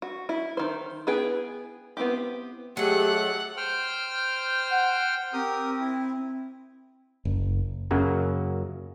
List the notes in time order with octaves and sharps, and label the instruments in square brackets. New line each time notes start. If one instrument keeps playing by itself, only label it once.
[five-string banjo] F#4
E4
D#3 C5
B3 E4 G#4 B4 G5
B3 C4 E4 G4
[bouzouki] F#3 G#3 [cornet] A3 [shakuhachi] G4 [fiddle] F#5
[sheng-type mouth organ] C5 G5 F6
[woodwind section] F#5
[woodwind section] C4 [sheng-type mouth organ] G4 A#4 D#6
[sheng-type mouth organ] E4
[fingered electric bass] F#1
[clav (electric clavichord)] F#2 C#3 F#3 A#3